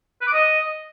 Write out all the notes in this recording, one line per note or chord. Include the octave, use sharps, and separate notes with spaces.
B4
D6
D#5